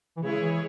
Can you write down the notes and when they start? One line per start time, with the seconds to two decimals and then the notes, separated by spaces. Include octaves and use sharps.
0.17 E3
0.21 C#3 G#3 E4 G#4 C#5
0.41 E3